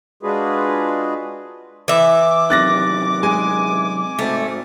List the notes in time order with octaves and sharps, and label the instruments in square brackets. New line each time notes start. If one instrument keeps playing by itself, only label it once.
[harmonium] G#3 D4 F4 F#4 G#4 B4
[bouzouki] E3 E5 [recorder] D6
[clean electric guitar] F#2 C3 D#3 [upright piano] F#6 A6 A#6
[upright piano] G#3 G#5
[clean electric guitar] G#2 C4 [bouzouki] A3